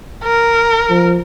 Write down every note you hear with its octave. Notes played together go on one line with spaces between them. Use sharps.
A#4
F3